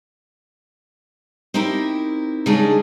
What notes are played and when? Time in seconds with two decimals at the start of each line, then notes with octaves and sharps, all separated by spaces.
1.54 C4 D#4 E4 G4 A#4
2.46 C#3 G3 G#3 D4 D#4 G#4